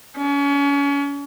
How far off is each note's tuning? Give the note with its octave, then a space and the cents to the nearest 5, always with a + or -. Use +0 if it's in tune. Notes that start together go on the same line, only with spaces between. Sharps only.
C#4 +35